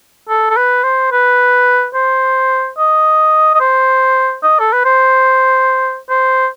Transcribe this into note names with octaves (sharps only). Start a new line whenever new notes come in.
A4
A4
B4
C5
B4
C5
D#5
D#5
C5
D#5
A4
B4
C5
C5